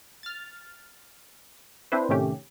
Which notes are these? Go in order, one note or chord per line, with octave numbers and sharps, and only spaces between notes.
F6 A6
C4 D4 E4 B4 C5
A2 C3 D#3 A3 C#4 G4